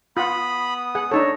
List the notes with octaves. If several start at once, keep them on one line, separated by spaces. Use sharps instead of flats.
B3 F4 F#5 B5 D#6
G#4 F#5
D4 D#4 A4 C#5